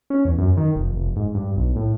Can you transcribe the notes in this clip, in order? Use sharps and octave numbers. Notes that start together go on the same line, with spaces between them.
C#4
E2
F#2
D#3
F1
F1
G#2
G2
B1
A2